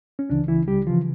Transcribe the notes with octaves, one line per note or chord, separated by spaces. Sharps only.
C#4
C#2 C#3 E3 D4
E3 E4
G3 G4
C#3 E3 F3 F4